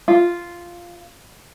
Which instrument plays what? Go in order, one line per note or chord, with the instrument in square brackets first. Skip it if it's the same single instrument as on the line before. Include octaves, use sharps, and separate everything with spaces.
[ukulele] F4